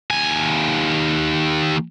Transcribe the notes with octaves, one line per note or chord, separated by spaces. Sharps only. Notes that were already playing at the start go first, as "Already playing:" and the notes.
D#2 G#5